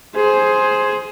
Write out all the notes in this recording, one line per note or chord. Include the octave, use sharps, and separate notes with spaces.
G#4 C5